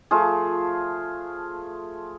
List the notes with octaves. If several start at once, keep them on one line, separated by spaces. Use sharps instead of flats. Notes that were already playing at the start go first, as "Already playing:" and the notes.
F3 A3 F4 G#4